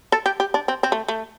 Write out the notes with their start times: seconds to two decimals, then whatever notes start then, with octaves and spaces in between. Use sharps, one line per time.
0.12 A4
0.26 G4
0.40 G4
0.54 D4
0.68 C4
0.83 C4
0.92 A3
1.08 A3